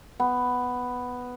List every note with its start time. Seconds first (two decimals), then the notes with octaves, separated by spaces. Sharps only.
0.20 B3